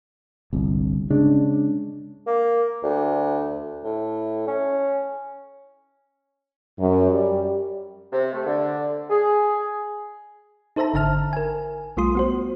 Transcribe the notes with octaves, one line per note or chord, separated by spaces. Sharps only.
G1 C2
C#3 G#3 D4
A#3
D2
A2
C#4
F#2
G3
C3
A3
D3
G#4
D#4 A4 C5 E5 A5 A#5
G#1 D3 E5 A5 F6
A#4 G#5
B1 G3 A3 F4 C6 D#6
B3 F#4 C5